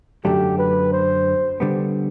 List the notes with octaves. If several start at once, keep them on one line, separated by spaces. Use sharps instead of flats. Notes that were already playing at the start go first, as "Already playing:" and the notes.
F#2 D3 F#3 A3 D4 G4
B4
C5
D3 G3 B3